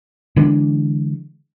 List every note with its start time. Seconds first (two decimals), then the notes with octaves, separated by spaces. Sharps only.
0.36 D3 E3 G#3 D4